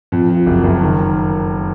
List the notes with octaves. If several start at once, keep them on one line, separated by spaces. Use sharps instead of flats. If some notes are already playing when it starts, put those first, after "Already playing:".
F2
F3
F#1
F#1
D#3